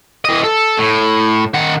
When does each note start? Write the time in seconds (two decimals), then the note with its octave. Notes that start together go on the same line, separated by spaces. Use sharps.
0.25 E3 D#5
0.44 A4
0.78 A2
1.54 D#3 F#5